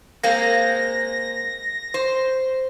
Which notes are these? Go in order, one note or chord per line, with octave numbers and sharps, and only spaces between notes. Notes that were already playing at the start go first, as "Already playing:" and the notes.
G#3 A#3 C4 A#6
C5